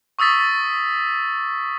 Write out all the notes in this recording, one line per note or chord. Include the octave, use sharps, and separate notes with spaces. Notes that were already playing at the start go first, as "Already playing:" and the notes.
C#6 D#6 E6 A6 B6